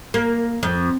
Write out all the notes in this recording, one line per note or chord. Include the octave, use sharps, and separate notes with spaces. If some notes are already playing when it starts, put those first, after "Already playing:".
A#3
F2